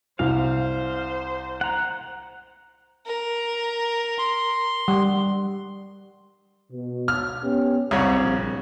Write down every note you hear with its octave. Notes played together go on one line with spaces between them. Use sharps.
C2 C5 F5
F#5 A#5
A#4
C6
G3
B2
F6
B3 C#4 G4
C2 C#3 C4 C#5
A#1